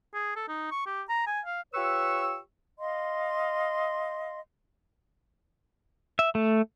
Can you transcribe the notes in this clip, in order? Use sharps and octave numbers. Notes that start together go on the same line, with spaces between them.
G#4
A4
D#4
C#6
G4
A#5
G#5
F5
F4 G4 B4 C#5 C#6 E6
D#5 F5 C6
E5
A3